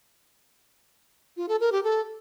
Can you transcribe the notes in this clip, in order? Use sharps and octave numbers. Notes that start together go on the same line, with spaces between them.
F4
A4
A#4
G4
A4